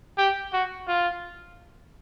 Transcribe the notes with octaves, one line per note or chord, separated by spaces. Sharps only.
G4
F#4
F4